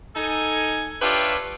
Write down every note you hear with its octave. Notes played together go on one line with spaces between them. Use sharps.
D#4 A4 G#5
D4 F4 G4 B4 C#5 E5